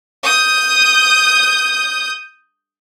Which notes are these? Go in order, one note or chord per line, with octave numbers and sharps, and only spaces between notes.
D#6 G6